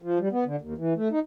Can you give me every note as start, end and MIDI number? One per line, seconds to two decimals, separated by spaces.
0.02 0.19 53
0.19 0.28 55
0.32 0.44 59
0.46 0.56 50
0.61 0.74 39
0.78 0.94 52
0.96 1.08 57
1.12 1.19 63